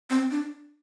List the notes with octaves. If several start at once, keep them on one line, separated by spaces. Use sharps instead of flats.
C4
D4